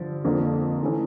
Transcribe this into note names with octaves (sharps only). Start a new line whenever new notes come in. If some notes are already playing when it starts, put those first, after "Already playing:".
Already playing: G2 D3 F3
F2 D3 F3 A#3
E3 A3 C#4